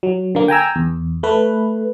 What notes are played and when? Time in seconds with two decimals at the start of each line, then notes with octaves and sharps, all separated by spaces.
0.03 F#3
0.35 D3 A#3
0.48 G5 G#5 A#5 E6
0.76 E2
1.23 A3 B4